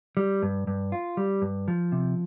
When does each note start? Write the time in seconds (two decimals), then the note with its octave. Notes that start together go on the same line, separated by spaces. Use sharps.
0.17 G3
0.43 G2
0.67 G2
0.92 F4
1.17 G3
1.42 G2
1.68 F3
1.92 C3